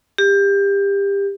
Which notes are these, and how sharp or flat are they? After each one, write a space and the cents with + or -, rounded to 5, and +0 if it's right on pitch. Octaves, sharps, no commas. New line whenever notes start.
G4 +25